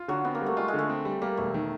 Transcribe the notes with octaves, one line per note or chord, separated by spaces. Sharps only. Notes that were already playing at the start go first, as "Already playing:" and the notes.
Already playing: F4
D3 F#3
B3 C4
A#3
G3
A3
G#3 F4
G#3
D3 A3
C4
G3
G3 A#3
E1 A3
D#3